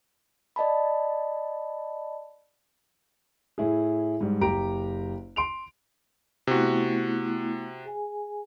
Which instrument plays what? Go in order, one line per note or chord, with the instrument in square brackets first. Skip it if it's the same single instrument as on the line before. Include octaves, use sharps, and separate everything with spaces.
[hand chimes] D5 D#5 A5 B5
[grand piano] A2 E4 G#4
G#2 G3
F#1 G4 A#5 D7
C6 D7 F7
[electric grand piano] C3 F#4 [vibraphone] A3 B3 E4
[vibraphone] G#4 G#5